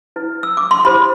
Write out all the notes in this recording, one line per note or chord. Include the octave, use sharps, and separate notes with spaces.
E4 B4
E6
D6
C6
E4 G4 C5 B5